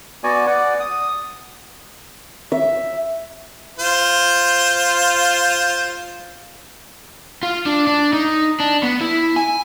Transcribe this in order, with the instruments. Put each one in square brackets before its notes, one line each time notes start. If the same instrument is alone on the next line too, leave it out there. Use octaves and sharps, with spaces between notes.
[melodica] B3 F#4 D5 G#5
D5 F#5
D#6
[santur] E5
[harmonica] F4 C5
[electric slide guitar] F4
D4
D4
D#4
D4
B3
E4
G#5